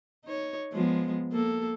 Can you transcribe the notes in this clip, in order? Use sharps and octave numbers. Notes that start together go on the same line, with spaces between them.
D#4 C#5
F3 G#3 B3
A#3 A4